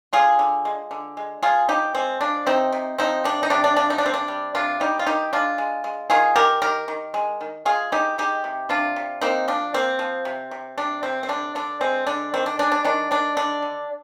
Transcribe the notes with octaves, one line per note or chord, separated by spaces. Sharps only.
D3 F4 G#4
D3
G#3
D3
G#3
F3 F4 G#4
F3 D#4 G4
G#3 C4
F3 D4
C3 C4 D#4
C3
F3 C4 D#4
C3 D4
D#4
C3 D4
D4
F3 D4
D#4
D4
C3 C4
D4
G3
C3 D4 F4
G3 D#4 G4
F4
D#3 D#4 G4
G#3 D4 F4
G#3
G#3
D#3 F4 G#4
D#3 G4 A#4
D#3 G4 A#4
D#3
G#3
D#3
G#3 F4 G#4
G#3 D#4 G4
G#3 D#4 G4
C3
C3 D4 F4
C3
A#3 C4 D#4
F3 D4
A#3 C4
F3
C3
C3
C3 D4
C3 C4
C4
D3 D4
D3 D4
G#3 C4
D3 D4
D#3 C4
D4
G#3 D4
D4
D#3 D4
D#3 D4
D3 D4
D3